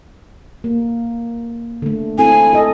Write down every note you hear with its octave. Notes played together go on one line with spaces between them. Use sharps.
A#3
D3 A3
C4 E4 A4 G#5
A4 D#5